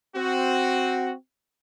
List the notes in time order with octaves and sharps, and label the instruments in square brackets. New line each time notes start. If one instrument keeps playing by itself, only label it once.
[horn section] C4 F#4